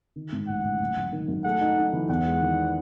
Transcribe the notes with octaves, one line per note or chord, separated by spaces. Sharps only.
D#3
G#2
A1 F#5
A1
F#1
F#1
D#3
F#2
A3 F#5
D#4
D#4
E3
E2 F#5
G#3
D#3